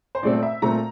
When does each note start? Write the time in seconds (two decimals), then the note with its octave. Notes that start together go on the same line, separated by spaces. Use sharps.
0.15 C5
0.23 A#2 A3 C4 D5
0.36 D5
0.42 E5
0.62 A#2 A3 C4 A#5